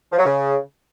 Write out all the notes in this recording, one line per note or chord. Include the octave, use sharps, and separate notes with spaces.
F3
F#3
C#3